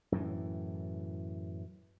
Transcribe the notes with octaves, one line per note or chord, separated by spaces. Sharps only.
F#2 A2 E3